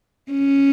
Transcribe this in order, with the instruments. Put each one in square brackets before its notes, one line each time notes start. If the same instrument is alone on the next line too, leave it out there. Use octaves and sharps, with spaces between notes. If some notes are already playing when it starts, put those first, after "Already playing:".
[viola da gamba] C#4